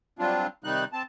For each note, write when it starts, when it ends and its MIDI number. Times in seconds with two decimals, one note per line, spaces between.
0.19 0.47 54
0.19 0.47 55
0.19 0.47 60
0.19 0.47 62
0.19 0.47 65
0.64 0.84 48
0.64 0.84 51
0.64 0.84 55
0.64 0.84 63
0.64 0.84 90
0.93 1.03 60
0.93 1.03 81